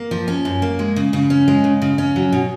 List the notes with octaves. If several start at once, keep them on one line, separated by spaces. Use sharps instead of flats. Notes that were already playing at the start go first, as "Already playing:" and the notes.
Already playing: A#3
F3
C#4
F#2
A#3
G#3
C#3
C#3
C#4
G#3
C#3
C#3
C#4
F#3
B2